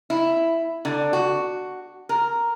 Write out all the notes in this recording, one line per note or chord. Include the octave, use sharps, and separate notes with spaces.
E4
D3
F#4
A#4